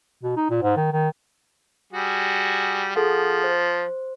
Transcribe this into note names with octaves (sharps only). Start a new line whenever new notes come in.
B2
D#4
A#2
G#2
D#3
D#3
G3 F#4 G#4
F3 G#4 A4 F#5
C5